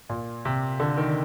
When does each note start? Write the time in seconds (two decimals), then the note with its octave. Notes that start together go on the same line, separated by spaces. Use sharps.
0.10 A#2
0.45 C3
0.80 D3
0.97 D#3